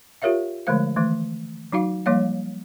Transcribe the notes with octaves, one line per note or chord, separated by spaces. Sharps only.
F4 G4 A#4 C#5 E5 F5
D3 F3 G#3 A3 C5 F5
D#3 E3 A3
F#3 D#4 F#4 F5
F3 G3 A#3 C#5 F5